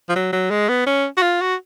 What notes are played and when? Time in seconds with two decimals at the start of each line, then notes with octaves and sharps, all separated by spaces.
0.09 F3
0.16 F#3
0.33 F#3
0.50 G#3
0.69 B3
0.87 C#4
1.17 F#4
1.22 F4
1.41 F#4